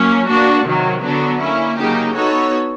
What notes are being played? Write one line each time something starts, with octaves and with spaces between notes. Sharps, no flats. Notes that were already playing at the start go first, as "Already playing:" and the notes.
Already playing: F#3 A#3 C#4
A#3 D4 F#4
C3 D#3 F#3
D3 F#3 B3 D4
A#3 C#4 E4
C#3 F#3 A#3 D#4 G4
B3 D#4 F#4 A4 C#5